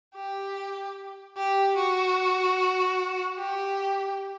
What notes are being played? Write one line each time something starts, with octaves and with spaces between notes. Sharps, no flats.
G4
G4
F#4
G4